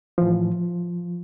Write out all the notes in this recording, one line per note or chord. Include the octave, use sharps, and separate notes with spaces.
A2 E3 F3